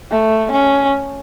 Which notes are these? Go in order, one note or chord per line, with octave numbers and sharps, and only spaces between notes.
A3
C#4